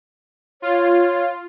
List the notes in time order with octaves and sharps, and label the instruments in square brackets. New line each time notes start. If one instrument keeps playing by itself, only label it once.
[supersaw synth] F4 [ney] C#5